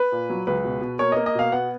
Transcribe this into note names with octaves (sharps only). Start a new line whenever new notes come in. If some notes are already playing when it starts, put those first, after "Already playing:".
Already playing: B4
A#2
F#3
C#2 B4
B2
B2
A#3 C#5
A#3 D#5
D#5
B2 F5
B3 F#5